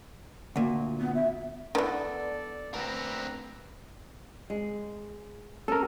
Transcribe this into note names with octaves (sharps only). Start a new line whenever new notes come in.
D2 A#2
B3
E5
D#3 E3 B3 D4 A4 D5
D2 C4 A#4 B4 A#5
G#3
C#4 A4 A#4